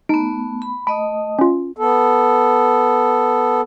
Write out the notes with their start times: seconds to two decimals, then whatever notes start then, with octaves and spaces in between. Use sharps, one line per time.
0.09 A3 B3 D#4
0.62 B5
0.87 A3 D#5 B5 D#6
1.39 C#4 F4
1.77 B3 A4